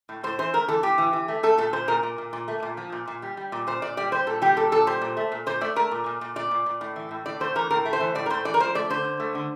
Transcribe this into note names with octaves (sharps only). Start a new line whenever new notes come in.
A2
A2 C5
E3 C5
A3 A#4
E3 A4
A2 G4
E3
E3
A3
A3 A4
A#2 A4
A#2 C5
A#2 A#4
A#2
A#2
A#2
A3
A#2
F3
A#2
A#2
G3
G3
A#2
A#2 C5
A#2 D5
G3 D5
G3 C5
A#2 A4
G3 G4
A#2 A4
A#2 A4
G3 C5
A#2
A3
A#2
A#2 C5
A3 D5
A3 A#4
A#2
A#2
A#2
A#2 D5
A#2
A#2
A2
E3
A2
A2 D5
A3 C5
E3 A#4
A2 A#4
A3
C5
E3
A2 D5
A#4
A3 C5
E3 D5
A#4
F3 C5
A3 D5
D3 C5
D3
A3
D3